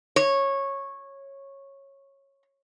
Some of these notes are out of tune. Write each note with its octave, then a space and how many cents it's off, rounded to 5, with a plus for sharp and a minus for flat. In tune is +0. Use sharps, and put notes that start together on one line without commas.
C#5 -15